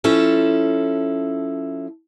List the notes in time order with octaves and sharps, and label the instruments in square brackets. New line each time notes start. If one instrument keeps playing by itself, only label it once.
[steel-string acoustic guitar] F3 C#4 E4 A4